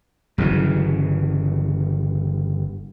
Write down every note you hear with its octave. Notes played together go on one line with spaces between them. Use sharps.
G1 C#3 E3 F#3